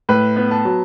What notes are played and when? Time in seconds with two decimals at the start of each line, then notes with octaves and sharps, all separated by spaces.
0.09 A2 B4
0.36 B3
0.51 A5
0.65 F#3